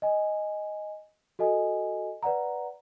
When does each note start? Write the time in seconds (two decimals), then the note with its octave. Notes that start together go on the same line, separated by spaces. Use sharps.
0.02 D#5 G#5
1.39 F#4 A4 D#5 G#5
2.23 B4 D5 F#5 A#5